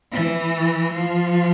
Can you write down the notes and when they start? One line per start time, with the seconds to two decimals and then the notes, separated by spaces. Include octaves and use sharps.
0.12 E3
0.93 F3